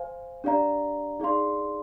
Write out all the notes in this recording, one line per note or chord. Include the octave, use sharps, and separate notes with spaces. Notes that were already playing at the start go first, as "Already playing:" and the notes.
Already playing: C5 F5 G#5
D4 G4 D5 F5 A#5
D#4 G#4 D5 F5 C6